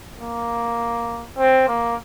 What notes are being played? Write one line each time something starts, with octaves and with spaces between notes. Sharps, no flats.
A#3
C4
A#3